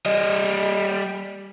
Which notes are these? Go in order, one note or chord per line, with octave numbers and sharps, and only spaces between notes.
G3 D#5